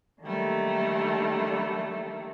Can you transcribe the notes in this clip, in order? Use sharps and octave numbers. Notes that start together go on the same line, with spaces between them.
D3 D#3 F#3 G3 A3 A#3